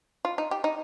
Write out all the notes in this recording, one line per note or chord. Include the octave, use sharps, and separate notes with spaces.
F4
D#4
G4
D#4